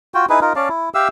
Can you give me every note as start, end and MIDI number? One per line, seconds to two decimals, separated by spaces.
0.14 0.26 65
0.14 0.26 66
0.14 0.26 79
0.29 0.40 63
0.29 0.40 64
0.29 0.40 68
0.29 0.40 71
0.41 0.53 63
0.41 0.53 65
0.41 0.53 70
0.56 0.69 61
0.56 0.69 74
0.56 0.69 77
0.56 0.69 81
0.69 0.89 64
0.94 1.08 67
0.94 1.08 76
0.94 1.08 77
0.94 1.08 88